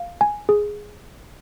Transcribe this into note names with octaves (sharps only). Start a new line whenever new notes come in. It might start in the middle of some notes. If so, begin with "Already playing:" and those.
Already playing: F5
G#5
G#4